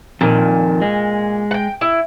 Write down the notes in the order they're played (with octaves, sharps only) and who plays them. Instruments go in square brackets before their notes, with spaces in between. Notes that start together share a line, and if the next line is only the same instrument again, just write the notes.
[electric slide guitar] F2 D#3 [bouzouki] A#2
[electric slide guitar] G#3
[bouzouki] F#5 G5
E4